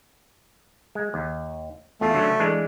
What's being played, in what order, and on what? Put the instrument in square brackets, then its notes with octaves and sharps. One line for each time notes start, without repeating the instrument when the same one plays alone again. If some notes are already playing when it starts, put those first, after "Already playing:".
[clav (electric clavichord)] G#3
D#2
[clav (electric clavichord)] E2 F4 [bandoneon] A3
[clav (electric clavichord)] D3 F#3 C#4
E3 G#3 D4